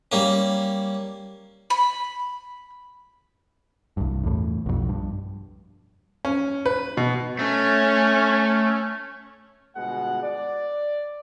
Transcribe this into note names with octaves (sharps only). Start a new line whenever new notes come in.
G3 A#3 C#4
B5
C2 G2
E2 A2
B1 F2
G2
C#4
B4
B2
A3 C#4
G1 B2 G#3 F#5
D5